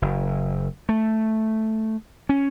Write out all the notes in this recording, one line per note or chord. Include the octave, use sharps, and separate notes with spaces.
F#1
A3
C#4